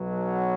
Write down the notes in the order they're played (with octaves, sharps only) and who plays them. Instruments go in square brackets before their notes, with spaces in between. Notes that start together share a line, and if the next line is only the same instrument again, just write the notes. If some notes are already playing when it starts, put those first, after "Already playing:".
Already playing: [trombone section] B1 B2 F#3